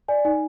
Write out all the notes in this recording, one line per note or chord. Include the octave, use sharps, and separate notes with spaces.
D5 G#5
D#4 G#5